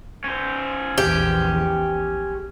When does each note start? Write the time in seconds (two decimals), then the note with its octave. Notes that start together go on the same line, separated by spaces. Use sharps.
0.24 C#4 C5
0.98 A#1 E2 G4